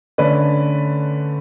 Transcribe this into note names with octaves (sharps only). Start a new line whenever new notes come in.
D3 A3 C#4 B4 D5